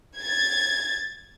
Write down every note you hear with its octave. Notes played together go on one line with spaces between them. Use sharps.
G#6 A6